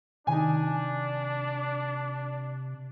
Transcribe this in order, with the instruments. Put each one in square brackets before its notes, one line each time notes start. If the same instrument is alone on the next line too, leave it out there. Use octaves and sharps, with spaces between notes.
[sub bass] C3 [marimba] D#3 [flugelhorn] D4 [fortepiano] D#4 G#5